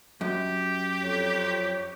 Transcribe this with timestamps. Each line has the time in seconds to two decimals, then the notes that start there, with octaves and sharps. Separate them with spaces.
0.21 F#2 G4
1.01 F2 C#5